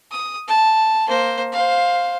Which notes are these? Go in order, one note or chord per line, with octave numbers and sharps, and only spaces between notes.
D#6
A5
A#3 C5
C5 F5